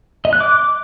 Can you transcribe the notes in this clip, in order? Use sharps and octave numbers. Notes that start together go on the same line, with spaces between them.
D#5
F#6
D6